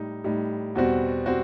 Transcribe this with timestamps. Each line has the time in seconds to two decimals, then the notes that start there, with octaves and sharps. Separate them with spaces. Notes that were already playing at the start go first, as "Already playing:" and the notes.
Already playing: A2 G3 D#4
0.24 A2 G3 D#4
0.75 E2 B2 G3 C4 F#4
1.26 G3 C4 F#4